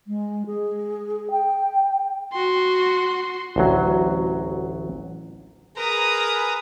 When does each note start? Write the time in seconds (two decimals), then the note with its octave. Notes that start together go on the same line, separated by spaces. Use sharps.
0.07 G#3
0.46 G#4
1.31 G5
2.33 F#4 C6
3.56 A1 D2 F#3
5.77 G#4 A#4 B4 A#5 D#6